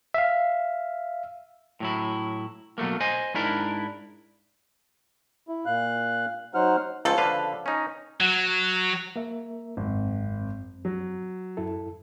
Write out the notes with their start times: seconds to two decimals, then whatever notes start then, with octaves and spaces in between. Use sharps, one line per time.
0.14 E5 F5
1.80 A2 F#3 E4
2.78 B2 F#3 A3 A#3
3.00 C5 D#5 G#5
3.34 G#2 D4 E4 A#4
5.48 E4
5.66 A#2 F5 F#6
6.55 F#3 D#4 C5 F#5 F6
7.05 C#2 C#3 F3 A4
7.18 D3 B4 F5
7.66 C#4 D#4
8.20 F#3
9.16 A#3 A#4 E5
9.77 G#1 F#2 C4
10.85 F#3
11.57 F#2 E4 A4